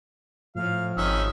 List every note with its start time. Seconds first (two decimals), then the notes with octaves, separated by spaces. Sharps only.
0.56 A2 F3 F5
0.97 G#1 D#3 C#4 E5